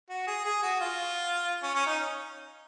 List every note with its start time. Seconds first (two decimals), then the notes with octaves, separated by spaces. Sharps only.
0.10 F#4
0.27 G#4
0.45 G#4
0.63 F#4
0.81 F4
1.63 C#4
1.75 C#4
1.87 D#4